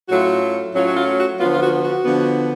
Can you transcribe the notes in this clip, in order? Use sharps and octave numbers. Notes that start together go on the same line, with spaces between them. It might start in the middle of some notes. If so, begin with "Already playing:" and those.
A2 F#3 A3 C#4 F4 F#4
A2 F#3 A3 C#4 F4 F#4
F#4
F4
F#4
D3 F3 B3 F4
F4
F#4
F#4
D3 F3 B3